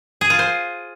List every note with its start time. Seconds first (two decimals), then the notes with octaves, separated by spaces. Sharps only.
0.21 G#4
0.30 F4
0.39 C5